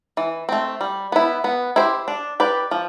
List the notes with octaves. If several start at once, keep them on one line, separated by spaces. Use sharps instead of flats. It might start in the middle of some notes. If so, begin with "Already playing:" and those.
E3
A3 C4
G3
B3 E4
B3
E4 G4 C5
D4
G4 B4 D5
F3